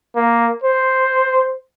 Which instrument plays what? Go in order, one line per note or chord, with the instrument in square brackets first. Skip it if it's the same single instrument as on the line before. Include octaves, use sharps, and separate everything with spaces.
[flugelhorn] A#3
C5